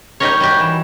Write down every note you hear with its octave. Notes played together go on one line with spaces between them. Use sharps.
G3 D#4 G4 A#4 C#5
G3 F#4 G4
E3